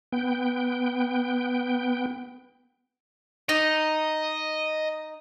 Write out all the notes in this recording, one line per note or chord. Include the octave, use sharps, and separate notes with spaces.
B3 G5
D#4 D#5